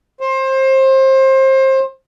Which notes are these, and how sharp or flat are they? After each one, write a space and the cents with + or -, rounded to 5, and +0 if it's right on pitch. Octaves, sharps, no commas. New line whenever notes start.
C5 +25